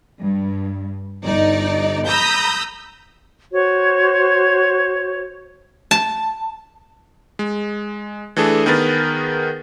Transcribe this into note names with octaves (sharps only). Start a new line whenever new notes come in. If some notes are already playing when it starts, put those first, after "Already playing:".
G2
G1 D#4 D5
A#5 B5 D#6 E6 G6 A#6
F#4 C5 C#5
A5
G#3
E3 A3 D4 G#4 A4
D#3 B3 G#4 A#4 B4 A6